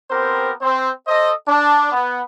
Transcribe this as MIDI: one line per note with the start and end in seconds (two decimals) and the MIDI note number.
0.11 0.52 59
0.11 0.52 60
0.11 0.52 67
0.11 0.52 70
0.11 0.52 72
0.62 0.91 60
0.62 0.91 72
1.07 1.32 69
1.07 1.32 72
1.07 1.32 75
1.48 1.90 62
1.92 2.22 59